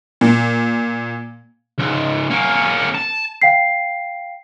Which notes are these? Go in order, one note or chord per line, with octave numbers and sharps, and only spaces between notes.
A#2
C#2 G#2
A#3 C#4
A5
F5 G5 B6 C7